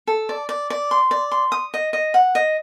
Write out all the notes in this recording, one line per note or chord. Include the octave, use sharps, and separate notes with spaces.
A4
D5
D5
D5
C6
D5
C6
D#6
D#5
D#5
F#5
D#5